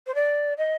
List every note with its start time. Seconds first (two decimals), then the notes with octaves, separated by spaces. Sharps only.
0.07 C5
0.15 D5
0.58 D#5